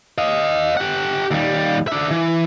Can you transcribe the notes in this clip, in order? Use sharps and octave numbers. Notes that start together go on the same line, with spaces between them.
D#5 F5
G4 F#5
D#2 G3
D4 E5
E3